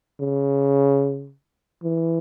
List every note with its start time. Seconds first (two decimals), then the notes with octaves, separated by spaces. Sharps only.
0.20 C#3
1.83 E3